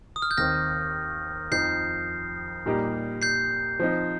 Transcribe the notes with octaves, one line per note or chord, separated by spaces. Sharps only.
D#6
F6
G6
D#2 D#3 C4 F6 A#6
F2 F3 D#4 G6 C7
A#2 G3 A#3 D#4 G4
G6 C7
F3 C4 D#4